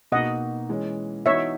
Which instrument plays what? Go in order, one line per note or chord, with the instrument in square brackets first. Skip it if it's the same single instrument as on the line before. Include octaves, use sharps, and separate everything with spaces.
[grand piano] B2 A#3 D#4 F#4 [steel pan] D#5 F#5
[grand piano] E3 G#3 C#4
[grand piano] E3 B3 D#4 F#4 [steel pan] C#5 E5